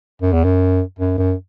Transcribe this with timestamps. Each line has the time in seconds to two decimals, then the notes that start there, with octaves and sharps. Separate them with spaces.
0.22 F#2
0.33 E2
0.44 F#2
0.99 F#2
1.18 F#2